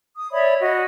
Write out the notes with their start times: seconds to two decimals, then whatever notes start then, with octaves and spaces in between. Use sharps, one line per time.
0.18 D#6
0.31 C#5 D5 E5 B5
0.58 F#4 D#5